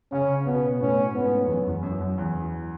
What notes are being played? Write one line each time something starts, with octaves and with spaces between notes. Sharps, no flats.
C#3 C#4
B2 B3
A2 C#4
G#2 B3
E2
F#2 C#4
E2
F#2 C#4
F#2
E2